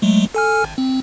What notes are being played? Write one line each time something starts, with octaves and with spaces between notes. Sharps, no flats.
F#3 G#3 A3
A4 G#5 F6
G#1
C4